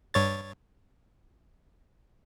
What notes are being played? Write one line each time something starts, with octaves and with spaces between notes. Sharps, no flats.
G2 C#5 A6